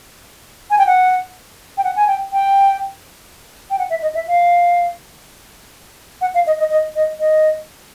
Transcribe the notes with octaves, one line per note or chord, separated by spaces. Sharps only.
G#5
G5
F#5
G5
F#5
G#5
G5
G5
G5
F#5
E5
D#5
E5
F5
F#5
F5
D#5
D#5
D#5
D#5
D#5